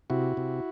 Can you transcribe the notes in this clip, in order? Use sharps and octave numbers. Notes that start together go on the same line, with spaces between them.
C3 E4 F#4
C3